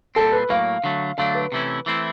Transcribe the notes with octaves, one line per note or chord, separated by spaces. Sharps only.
A#2 G3 C4 A4
B4
A2 F#3 A#3 F5
D3 F#3 A3
D3 F#3 A3 D4 F5
B4
C3 E3 A3 C#4 E4
E3 A3 C4 E4